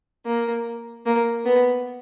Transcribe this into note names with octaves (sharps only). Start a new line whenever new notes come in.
A#3
A#3
B3